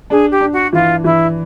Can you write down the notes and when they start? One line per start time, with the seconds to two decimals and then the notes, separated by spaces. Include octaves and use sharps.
0.10 D4 G#4
0.31 G4
0.41 D4
0.52 F#4
0.73 E3 F4
1.04 E3 E4